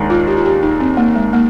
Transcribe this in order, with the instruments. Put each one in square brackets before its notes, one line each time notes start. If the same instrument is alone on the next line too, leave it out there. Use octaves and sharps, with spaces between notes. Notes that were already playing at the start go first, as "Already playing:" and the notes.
Already playing: [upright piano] D#2 D#3 G#3 D4
[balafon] F4
G4
F4
G4
D#4
C4
A#3
G#3
A#3